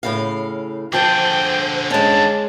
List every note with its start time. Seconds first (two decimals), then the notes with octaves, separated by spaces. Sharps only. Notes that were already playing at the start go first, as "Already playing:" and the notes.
0.03 A2 C#3 F5
0.93 D3 F3 G#4 C5 G5 A5
1.90 G#3 C#4 A5